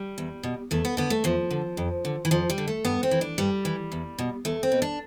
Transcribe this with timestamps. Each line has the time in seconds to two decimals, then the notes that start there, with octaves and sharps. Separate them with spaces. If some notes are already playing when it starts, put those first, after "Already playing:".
Already playing: G3
0.18 E2
0.43 B2
0.71 E2 A3
0.85 B3
0.97 D3 B3
1.10 A3
1.24 E2 F3
1.51 D3
1.77 F2
2.05 D3
2.25 E3
2.31 F2 F3
2.50 G3
2.58 D3
2.68 A3
2.85 G2 B3
3.03 C4
3.11 E3
3.21 D4
3.38 G2 G3
3.65 E3
3.92 E2
4.19 B2
4.45 E2 A3
4.63 C4
4.72 B2
4.82 D4